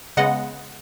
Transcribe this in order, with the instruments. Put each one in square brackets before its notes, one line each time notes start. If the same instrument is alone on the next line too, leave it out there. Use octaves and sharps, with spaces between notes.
[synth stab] C#3 G#3 B3 D#5 F#5